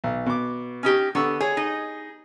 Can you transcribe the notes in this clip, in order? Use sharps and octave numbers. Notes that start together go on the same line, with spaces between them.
B1
B2 D6
C#4 D#4 G4
D3 B3 C#6 E6
G#4 C#5
D#4